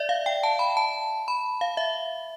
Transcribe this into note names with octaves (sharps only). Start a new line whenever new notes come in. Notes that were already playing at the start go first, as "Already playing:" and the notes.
Already playing: D5 E5
F5
G5
A5
B5
A5
B5
F5
E5